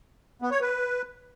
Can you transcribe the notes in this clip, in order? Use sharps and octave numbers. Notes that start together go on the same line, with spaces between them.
B3
C#5
B4